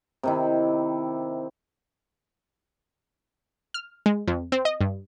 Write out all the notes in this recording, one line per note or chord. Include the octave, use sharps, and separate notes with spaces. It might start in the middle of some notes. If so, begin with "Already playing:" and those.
C3 D#3 E4
F6
G#3
F2
C4
D#5
G2